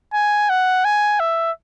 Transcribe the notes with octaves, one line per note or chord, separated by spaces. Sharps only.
G#5
F#5
G#5
E5